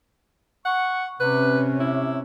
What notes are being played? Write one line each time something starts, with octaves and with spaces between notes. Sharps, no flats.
F#5 C#6
C3 C4 C#4 B4
E4